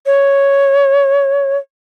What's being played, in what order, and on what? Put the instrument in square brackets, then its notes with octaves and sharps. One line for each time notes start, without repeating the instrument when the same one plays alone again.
[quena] C#5